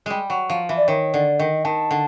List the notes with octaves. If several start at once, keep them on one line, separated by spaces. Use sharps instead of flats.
G3 G#3
F#3
F3
E3
D5
D#3 C#5
D3 D5
D#3 D#5
D#3 A5
D3